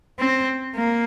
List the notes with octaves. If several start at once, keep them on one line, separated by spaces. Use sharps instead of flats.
C4
A#3